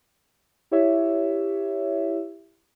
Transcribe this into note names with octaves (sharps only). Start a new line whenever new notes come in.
E4 G4 C#5 E5